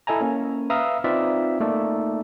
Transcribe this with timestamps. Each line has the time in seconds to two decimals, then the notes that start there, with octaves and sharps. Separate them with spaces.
0.07 E4 A4 D#5 G#5 A#5
0.21 A#3 C#4
0.70 B4 E5 F5 A#5 D#6 E6
1.04 C4 D#4 F4 B4 D5 E5
1.60 A3 A#3 D#4 A4 D5